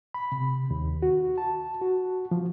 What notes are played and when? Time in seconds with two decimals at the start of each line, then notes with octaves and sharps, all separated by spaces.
0.14 B5
0.32 C3
0.71 D#2
1.02 F#4
1.38 A5
1.81 F#4
2.31 F3